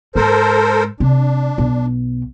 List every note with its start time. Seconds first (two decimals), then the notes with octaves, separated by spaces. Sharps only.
0.16 G#2 G#3 A4 A#4 C5
1.00 C3 D4
1.58 B1